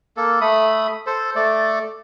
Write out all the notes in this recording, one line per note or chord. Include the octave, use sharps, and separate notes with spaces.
A#3 A4
A3 B5 D#6
A4 C5
A3 A4 D5